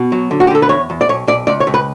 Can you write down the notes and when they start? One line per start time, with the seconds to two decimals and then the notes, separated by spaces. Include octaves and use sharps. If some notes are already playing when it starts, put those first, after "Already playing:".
Already playing: B2
0.12 F#3
0.31 D3
0.40 F#4
0.47 G4
0.50 D3 A4
0.62 B4
0.69 E2 C#5
0.90 E2
1.01 D5
1.09 B1 C#5
1.27 B1 D5
1.47 C#2 D5
1.60 C#5
1.67 C#2
1.74 B4